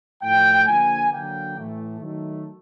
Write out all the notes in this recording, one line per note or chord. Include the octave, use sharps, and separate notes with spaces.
A2 F3 A3 G5
D3 F3 A#3 G#5
D3 F#3 A#3 G5
A2 E3 A3
D#3 F#3 A3